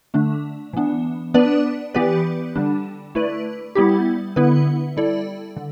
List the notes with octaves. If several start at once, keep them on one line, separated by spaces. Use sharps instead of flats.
D3 A3 D4
E3 B3 D4
B3 D4 B4 D5
E3 B3 G4 B4 D5
D3 G3 D4
A3 E4 B4 D5
G3 B3 E4 G4
D3 B3 E4 B4
G3 E4 A4 D5
D3